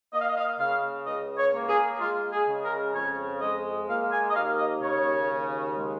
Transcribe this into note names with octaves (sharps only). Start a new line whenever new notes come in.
A#3 D#5
F5
D#5
F5
D#5
C#3 F5
C#2 D#5
C#5
A#3
G#4
G#3 F4
G#4
C#3
A#4
F2 C#5
G#3 D#5
A#3 F5
G#5
D#5
D#2 F5
D#5
C#3 C#5
D#2
G#3